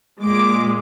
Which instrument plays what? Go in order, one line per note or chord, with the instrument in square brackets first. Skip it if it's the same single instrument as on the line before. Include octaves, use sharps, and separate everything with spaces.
[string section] A#2 G#3 D6